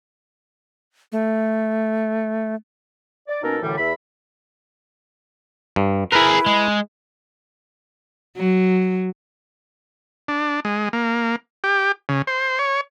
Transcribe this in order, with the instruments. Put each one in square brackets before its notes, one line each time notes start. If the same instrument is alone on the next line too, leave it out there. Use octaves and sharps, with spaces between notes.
[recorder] A3
[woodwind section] D5
B2 A#3 C#4 D#4 A4 A#4
F#2 A2 D3 E3 G3
E2 E5 B5
[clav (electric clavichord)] G2
[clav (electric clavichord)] E4 B4 [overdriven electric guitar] G#4 A#4 [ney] B5
[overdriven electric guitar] G#3
[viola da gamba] F#3
[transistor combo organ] D4
G#3
A#3
G4
C#3
C5
C#5